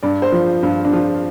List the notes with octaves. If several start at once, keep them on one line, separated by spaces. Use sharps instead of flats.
G2 D5
C5
F3
G2 F4
D4
F3 F4